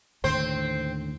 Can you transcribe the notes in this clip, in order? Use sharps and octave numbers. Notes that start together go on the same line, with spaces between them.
D#2 A2 D3 C4 C5